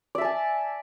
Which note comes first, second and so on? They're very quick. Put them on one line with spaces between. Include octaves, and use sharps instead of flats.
D5 E5 A5 G#5